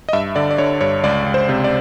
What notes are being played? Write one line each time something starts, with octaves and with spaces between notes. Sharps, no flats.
D#5
G2 E5
D3 D5
D5
D3 C#5
G2 C#5
C#2 D5
C#2
C5
C3
D5